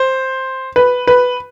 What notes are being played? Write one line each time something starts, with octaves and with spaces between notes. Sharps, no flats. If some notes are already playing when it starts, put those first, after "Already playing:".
Already playing: C5
B4
B4